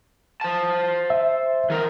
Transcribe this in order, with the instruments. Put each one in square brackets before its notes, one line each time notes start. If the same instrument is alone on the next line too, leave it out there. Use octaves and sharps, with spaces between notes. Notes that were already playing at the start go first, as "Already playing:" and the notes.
[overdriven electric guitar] C5 A5
[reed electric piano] E5
[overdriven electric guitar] E3 A#4